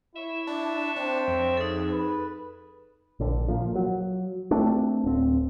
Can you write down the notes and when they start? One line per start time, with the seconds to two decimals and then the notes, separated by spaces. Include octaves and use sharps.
0.15 E4 C#5 E5
0.47 D4
0.96 C4 D4
1.28 F2
1.57 D#4 G#4 A4
1.92 B4
3.20 A#1 D3
3.48 A#2 F3
3.76 F#3
4.51 A3 C4 D4
5.04 D1 C4